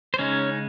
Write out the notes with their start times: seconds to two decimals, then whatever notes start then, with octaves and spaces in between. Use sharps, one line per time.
0.14 C5
0.19 C#3 G#3 C#4 D#4 C#5